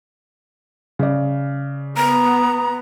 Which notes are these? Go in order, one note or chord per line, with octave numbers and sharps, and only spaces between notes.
C#3 D5
B3 A#5